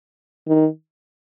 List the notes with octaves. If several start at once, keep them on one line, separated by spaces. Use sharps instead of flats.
D#3